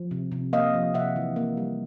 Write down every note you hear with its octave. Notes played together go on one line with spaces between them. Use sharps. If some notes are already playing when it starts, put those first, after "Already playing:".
Already playing: F3
C3
C3
A#3 D#5 F5
F3
C3 E5 F#5
E3
A#3
G3